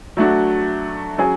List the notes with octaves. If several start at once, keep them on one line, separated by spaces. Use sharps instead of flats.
F#3 A3 D4 F#4
F#3 C#4 G#4